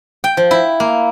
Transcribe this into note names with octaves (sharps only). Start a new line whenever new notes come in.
G5
F3
E4
A#3